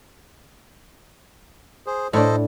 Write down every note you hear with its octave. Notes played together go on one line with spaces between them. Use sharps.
G#4 C5
A2 D4 A4 C5 D#5